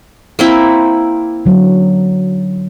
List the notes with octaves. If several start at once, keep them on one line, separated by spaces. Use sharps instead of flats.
A#3 C4 E4
D3 F#3